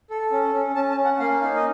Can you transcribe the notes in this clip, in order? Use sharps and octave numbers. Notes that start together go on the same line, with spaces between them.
A4
C#4
C#4
C#4 A5
A5
C#4
F#5
A#3 F5
D#4 F5
D#5